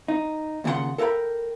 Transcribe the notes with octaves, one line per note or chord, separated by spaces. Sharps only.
D#4
D#2 A#2 C#3 D#4 F#5 C6
A4 A#4 C5 F5 G5 B5